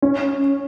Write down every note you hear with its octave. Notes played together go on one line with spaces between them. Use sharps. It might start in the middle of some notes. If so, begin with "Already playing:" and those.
C#4